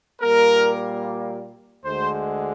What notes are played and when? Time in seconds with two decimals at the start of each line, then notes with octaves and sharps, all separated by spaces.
0.21 A#2 G3 A#3 A#4
1.84 D2 D3 G#3 C5